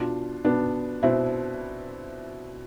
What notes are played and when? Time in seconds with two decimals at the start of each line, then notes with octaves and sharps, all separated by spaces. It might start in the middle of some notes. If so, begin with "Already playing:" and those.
Already playing: B2 D4 F4
0.45 B2 B3 D4
1.03 B2 C4 E4